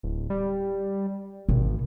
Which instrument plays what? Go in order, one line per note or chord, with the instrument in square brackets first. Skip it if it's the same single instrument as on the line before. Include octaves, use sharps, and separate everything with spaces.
[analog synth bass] D1
G3
[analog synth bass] G#1 [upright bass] B2 A3